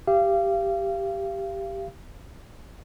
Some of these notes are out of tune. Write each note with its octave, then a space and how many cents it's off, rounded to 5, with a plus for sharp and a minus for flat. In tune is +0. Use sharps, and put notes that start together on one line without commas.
G4 +0 F5 -30